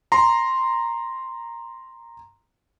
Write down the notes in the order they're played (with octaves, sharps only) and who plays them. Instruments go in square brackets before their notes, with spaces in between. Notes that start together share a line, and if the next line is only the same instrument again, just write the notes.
[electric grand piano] A#5 C6